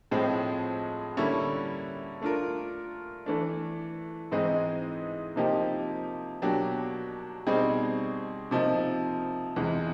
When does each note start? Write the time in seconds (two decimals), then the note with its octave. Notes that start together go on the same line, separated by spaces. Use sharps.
0.11 A2 F3 G#3 C4
1.17 D3 G3 A#3 C#4 E4
2.21 A3 D4 F4 A#4
3.26 E3 A3 D4
4.31 G#2 E3 G#3 C4 D#4
5.36 C3 F3 A#3 D#4 G4
6.42 B2 F#3 A#3 D4 G4
7.47 B2 G3 C4 D#4 G#4
8.51 C3 F3 A#3 D#4
9.56 E2 C3 E3 G#3